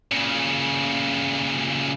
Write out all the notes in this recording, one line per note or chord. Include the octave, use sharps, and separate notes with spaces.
A#2 C#3